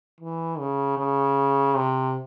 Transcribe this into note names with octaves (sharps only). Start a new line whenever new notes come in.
E3
C#3
C#3
C3